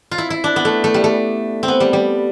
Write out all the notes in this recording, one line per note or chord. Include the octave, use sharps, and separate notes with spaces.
F4
E4
E4
D4
B3
A3
A3
G3
A3
C4
B3
G3
G3